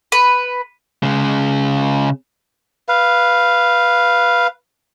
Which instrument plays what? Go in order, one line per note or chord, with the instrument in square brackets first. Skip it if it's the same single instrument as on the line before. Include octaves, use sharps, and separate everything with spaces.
[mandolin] B4
[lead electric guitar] C#3 G#3
[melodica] B4 F5